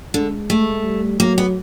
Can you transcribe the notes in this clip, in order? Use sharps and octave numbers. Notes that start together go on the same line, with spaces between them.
D3 G#3
A3
G3
F#3 A#3
B3